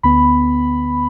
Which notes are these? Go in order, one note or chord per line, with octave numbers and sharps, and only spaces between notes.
D2 D3 B3 B5